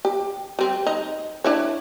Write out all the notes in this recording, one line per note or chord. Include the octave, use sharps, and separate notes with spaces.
G4
G3 C4
D#4
D4 E4 C#5